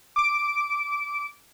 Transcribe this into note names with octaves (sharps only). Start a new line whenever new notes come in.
D6 D7